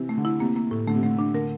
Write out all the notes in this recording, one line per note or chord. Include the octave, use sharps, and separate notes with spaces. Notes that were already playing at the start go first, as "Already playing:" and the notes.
Already playing: C3 E3 C4
A3
D3
E4
C3 A#3
A#3
A2
D3 A3
C3
D3 A3
D4
D3 A#4